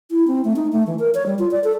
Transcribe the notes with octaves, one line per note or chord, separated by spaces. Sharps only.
E4
C4
A3
D#4
A3
E3
A#4
C#5
G3
F4
D5
A4